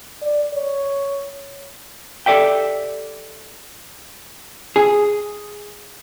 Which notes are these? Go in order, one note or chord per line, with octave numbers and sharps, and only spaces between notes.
D5
C#5
G4 A4 D5 E5 G5
G#4